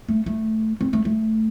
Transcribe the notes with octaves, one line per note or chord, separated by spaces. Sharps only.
A3
A3
C4
A3
A3